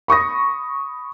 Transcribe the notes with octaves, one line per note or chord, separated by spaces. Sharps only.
B5 C#6 D#6 A#6